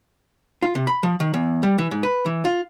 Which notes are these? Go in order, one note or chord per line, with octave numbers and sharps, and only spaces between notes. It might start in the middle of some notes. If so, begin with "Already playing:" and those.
F4
C3
B5
F3
D#3
E2
G3
E3
G#2
B4
E3
F4